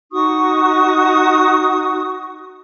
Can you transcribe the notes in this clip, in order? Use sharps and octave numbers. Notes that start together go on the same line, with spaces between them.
D#4 F#4 C#6 D#6